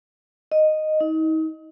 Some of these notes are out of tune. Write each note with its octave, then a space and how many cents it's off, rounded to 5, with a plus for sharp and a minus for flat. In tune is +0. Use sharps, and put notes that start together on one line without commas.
D#5 -5
D#4 +35